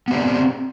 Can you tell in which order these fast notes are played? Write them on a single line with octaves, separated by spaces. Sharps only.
B3 G4 D4 G#4 C4